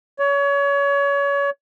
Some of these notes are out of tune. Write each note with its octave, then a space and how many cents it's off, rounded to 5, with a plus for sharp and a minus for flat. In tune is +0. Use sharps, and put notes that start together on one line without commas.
C#5 +30